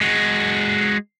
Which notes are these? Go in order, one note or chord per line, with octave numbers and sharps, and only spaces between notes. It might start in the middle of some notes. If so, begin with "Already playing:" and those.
G#3 F#4